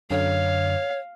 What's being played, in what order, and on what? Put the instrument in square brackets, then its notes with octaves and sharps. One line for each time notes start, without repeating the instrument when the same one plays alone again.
[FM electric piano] F#2 D3 [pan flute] C#5 [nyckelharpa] F5